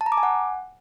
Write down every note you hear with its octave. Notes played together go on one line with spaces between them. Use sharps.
A5
A#5
D6
G#5
F#5